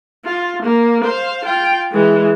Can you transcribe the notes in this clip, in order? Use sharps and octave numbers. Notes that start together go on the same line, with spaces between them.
F4
A#3
C5 F5
F4 G5
E3 G#3